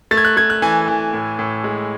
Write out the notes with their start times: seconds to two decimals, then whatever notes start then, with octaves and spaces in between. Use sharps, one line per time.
0.11 A3 A6
0.17 G#6
0.25 F#6
0.37 A3 G#6
0.50 F#6
0.62 E3 G#5
0.88 E3
1.13 A2
1.39 A2
1.64 G#3